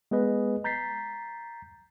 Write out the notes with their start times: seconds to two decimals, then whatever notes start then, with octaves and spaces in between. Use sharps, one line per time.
0.11 G#3 B3 G#4 B4 D#5
0.64 A#5 G6 A6 B6 C7